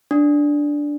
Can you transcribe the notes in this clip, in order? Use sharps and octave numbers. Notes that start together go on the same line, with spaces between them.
D4